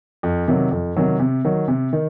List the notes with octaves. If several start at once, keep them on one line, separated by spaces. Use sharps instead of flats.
F2
C3 D#3 F#3
F2
C3 D#3 F#3
C3
D#3 F#3
C3
D#3